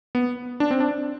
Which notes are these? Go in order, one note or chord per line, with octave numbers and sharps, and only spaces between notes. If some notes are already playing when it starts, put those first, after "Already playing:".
B3
D4
C4
D4